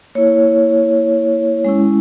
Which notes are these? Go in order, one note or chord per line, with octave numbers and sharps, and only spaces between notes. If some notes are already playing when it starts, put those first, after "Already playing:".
A#3 E4 C#5
G#3 C#4 E4